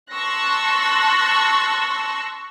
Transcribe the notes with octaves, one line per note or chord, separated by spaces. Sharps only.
A5 C6 C#6 E6 F#6 A#6